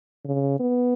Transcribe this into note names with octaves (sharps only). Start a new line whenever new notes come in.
C#3
B3